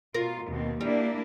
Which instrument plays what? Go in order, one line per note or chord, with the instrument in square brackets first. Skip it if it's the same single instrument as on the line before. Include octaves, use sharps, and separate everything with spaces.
[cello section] B2 F4 [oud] A#4
[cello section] D#2 B2 C4
[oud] G3 [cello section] A#3 D4 E4